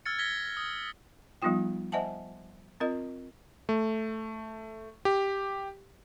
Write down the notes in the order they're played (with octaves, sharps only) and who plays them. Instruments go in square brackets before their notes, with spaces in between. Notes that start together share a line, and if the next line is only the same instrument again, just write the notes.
[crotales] E6 F6 G#6 A6 C#7
G#6 A#6 B6 G7
D#6
[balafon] F3 G3 B3 D#4 F4 G5
C5 D#5 E5 F#5 G#5 A5
C4 F4 A#4 D#5
[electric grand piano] A3
G4